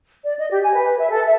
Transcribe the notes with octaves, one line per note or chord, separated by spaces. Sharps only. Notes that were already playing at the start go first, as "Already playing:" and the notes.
D5
D#5
G4
G#5
B4
E5
A4
E5